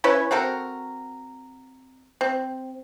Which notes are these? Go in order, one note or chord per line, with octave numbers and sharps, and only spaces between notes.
C#4 E4 B4 C#5
C4 F#4 A4 A#4
C4